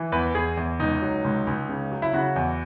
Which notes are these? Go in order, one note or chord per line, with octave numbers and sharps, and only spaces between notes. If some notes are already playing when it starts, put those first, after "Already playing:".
Already playing: E3
E2 B4
E2 G#4
E2
C#2 D#4
F#3
C#2
C#2
C#3
F#3
E4
C#3 F#4
E2